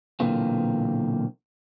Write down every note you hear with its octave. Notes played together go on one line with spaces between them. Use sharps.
B1 A#2 D3 E3 A#3 C4